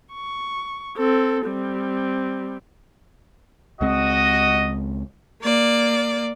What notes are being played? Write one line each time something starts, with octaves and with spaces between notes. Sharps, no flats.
C#6
C4 A4
G3 C4
C#2 G#3 C4 F#4 D#5
A#3 D5